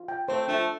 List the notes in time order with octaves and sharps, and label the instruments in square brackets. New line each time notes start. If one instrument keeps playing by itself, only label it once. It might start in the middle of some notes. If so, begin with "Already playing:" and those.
Already playing: [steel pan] F4
G5
[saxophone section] A3 C4 [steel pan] C5
[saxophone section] F3 A3 [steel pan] D4